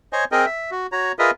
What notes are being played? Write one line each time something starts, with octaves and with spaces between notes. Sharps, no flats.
C5 C#5 D#5 G#5
C4 G#4 A#4 D#5 G5
E5
F#4
F#4 C#5 A#5
F4 G#4 A#4 B4 D#5 E5